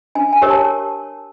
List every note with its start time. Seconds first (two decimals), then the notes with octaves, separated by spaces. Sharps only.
0.15 D4 G#5
0.33 G#5
0.42 G4 A#4 C#5
0.51 A5